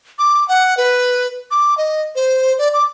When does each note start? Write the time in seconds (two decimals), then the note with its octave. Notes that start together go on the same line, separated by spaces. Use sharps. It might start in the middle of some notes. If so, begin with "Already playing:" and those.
0.19 D6
0.48 F#5
0.77 B4
1.51 D6
1.78 D#5
2.15 C5
2.59 D5
2.74 D6